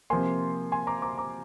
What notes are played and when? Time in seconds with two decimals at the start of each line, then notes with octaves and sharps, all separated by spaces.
0.10 C3 F3 A#3 G#5 C6
0.72 G#5 C6
0.87 A#5 D6
1.02 A#5 D6
1.17 A#5 D6